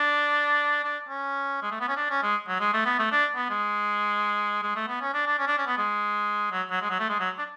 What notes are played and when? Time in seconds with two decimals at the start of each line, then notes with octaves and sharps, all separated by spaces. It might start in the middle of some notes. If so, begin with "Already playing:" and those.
Already playing: D4
0.84 D4
1.09 C#4
1.62 G#3
1.71 A3
1.81 B3
1.88 C#4
1.97 D4
2.10 C#4
2.22 G#3
2.48 F#3
2.60 G#3
2.74 A3
2.86 B3
2.99 A3
3.12 D4
3.36 B3
3.50 G#3
4.63 G#3
4.76 A3
4.88 B3
5.01 C#4
5.14 D4
5.26 D4
5.39 C#4
5.48 D4
5.58 C#4
5.67 B3
5.77 G#3
6.52 F#3
6.71 F#3
6.81 G#3
6.90 F#3
7.00 A3
7.10 G#3
7.19 F#3
7.38 D4